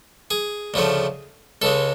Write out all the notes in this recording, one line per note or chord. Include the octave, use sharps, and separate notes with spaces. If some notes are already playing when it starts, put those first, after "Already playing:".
G#4
D2 C#3 F3 A3
C#2 C#3 G#3 A4